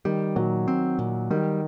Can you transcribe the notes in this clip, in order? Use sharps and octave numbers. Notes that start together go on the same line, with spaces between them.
D#3 G3
A#2 F#3
C4
A#2
D#3 G3